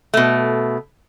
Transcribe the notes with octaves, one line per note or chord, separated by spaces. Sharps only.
B2 A3